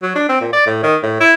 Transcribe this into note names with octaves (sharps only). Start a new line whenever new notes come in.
F#3
D4
C4
A#2
D5
A2
D#3
A2
E4